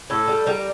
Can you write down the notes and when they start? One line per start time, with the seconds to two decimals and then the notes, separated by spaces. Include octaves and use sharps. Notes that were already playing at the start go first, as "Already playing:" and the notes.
0.10 A2 A4
0.28 G3
0.47 G3 A#4